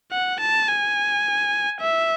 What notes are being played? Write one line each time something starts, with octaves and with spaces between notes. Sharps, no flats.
F#5
A5
G#5
E5